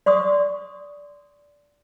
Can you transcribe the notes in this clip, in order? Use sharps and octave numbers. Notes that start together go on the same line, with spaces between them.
D5 C6 C#6 D#6